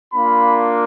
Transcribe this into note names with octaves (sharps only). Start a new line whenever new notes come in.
A#3 D4 F4 B5